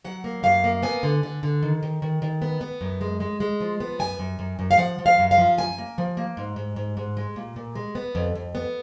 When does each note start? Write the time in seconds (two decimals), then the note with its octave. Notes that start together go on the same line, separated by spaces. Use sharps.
0.04 F#3 F#5
0.24 A#3
0.43 F#2 F5
0.64 A#3
0.83 B3 G#5
1.03 D3
1.23 D3
1.43 D3
1.63 D#3
1.83 D#3
2.02 D#3
2.22 D#3
2.42 B3
2.61 B3
2.81 F#2
3.01 G#3
3.20 G#3
3.40 G#3
3.60 F3
3.80 B3
3.99 F#2 G#5
4.19 F#2
4.39 F#2
4.59 F#2
4.71 F5
4.78 F3 F#5
4.99 F3
5.06 F5
5.19 F#2
5.31 F5
5.38 F3
5.58 F#2 G#5
5.78 A#3
5.98 F3
6.17 A#3
6.37 G#2
6.56 G#2
6.76 G#2
6.97 G#2
7.17 G#3
7.36 A#2
7.56 A#2
7.75 G#3
7.95 B3
8.15 F2
8.35 F2
8.55 B3